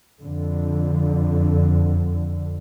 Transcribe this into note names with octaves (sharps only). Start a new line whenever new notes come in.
F2 D3